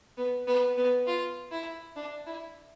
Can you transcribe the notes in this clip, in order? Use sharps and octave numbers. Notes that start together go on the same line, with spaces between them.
B3
B3
B3
F4
E4
D4
E4